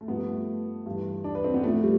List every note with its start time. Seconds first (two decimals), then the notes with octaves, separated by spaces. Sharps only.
0.01 A3
0.08 G2 F3 B3
0.28 A3
0.86 G2 E3
1.24 D4
1.35 B4
1.44 C4
1.54 B3
1.64 A2 F3 A3
1.83 G3